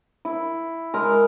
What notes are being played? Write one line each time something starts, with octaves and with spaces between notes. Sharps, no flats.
E4
G#3 A#4 A#5